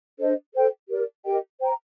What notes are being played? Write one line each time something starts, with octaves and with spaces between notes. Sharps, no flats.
D4 A4 C5 D#5
A4 C5 G5
G4 A#4 D5
G4 A#4 D#5 G5
C5 G5 A#5